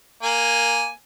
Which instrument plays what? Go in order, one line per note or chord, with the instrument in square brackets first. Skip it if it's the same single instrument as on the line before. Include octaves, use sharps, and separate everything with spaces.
[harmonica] A#3 G#5